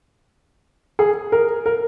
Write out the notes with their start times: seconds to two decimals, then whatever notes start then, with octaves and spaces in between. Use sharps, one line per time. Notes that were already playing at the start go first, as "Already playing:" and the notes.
0.99 G#4
1.32 A#4
1.66 A#4